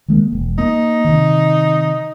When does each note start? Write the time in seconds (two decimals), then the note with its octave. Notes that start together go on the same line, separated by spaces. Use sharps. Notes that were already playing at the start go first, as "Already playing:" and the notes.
0.08 D#3 G#3 A#3
0.32 E1
0.58 A#3 D#4
1.04 C3 D#3